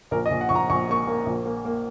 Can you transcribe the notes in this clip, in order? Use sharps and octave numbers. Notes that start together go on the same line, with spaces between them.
A#1 A#4
D#5
A#1
F#5
A#1 C#6
A#5
A#1 C#6
A#3 C#6
A#3
A#1
A#3
A#3